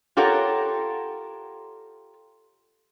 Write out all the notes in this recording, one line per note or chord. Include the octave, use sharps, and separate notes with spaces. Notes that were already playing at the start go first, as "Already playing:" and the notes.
F4 G4 A4 A#4 C#5 F#5